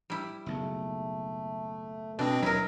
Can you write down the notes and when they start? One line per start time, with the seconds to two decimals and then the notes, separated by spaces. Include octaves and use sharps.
0.10 G3 E4
0.46 F#1 B1 C#3 A3
2.19 B2 C4 D4 B4 D#5
2.43 D#2 F#3 E4 A#4